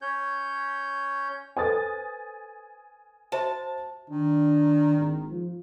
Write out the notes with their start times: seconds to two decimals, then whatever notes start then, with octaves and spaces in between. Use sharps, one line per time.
0.02 C#4 C#5 G6
1.57 A4 B4 C5 G#5 D#6 A6
3.32 F#4 C5 E5 A5
4.10 D#3 D4
4.98 G#1
5.30 F3